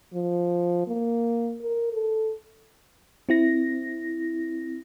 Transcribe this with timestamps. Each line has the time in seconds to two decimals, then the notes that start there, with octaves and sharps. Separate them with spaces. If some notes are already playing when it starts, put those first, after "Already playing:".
0.14 F3
0.87 A#3
1.63 A#4
1.92 A4
3.29 C4 E4 A#6